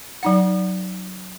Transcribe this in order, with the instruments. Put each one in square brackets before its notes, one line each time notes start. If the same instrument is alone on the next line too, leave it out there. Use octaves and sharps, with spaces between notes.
[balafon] F#3 D#4 F#5